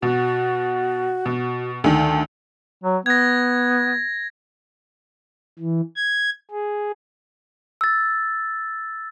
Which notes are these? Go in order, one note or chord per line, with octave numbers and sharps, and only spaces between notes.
B2 F#4
B2
D2 D#3 A5
F#3
B3 G#6 A#6
E3
G#6
G#4
E6 A6